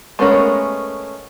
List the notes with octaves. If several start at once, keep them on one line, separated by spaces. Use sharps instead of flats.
G#3 A3 B3 C#4 A#4